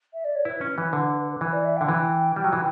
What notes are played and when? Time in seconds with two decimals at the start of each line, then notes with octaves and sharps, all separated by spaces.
0.13 E5
0.24 D5
0.35 C#5
0.45 E4 B4
0.61 C#4
0.78 E3
0.93 D3
1.41 E3 B4
1.53 D5
1.65 E5
1.77 D3 G5
1.89 E3
2.36 G3
2.44 F#3
2.53 E3